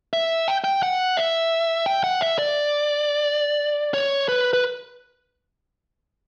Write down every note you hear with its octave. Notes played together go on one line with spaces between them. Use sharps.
E5
G5
G5
F#5
E5
G5
F#5
E5
D5
C#5
B4
B4